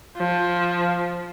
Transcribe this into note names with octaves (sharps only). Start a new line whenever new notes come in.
F3